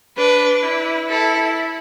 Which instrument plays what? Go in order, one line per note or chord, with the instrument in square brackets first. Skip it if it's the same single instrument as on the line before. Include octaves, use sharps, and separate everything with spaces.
[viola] D4 [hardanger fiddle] B4
[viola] E4
[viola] E4 [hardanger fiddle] A4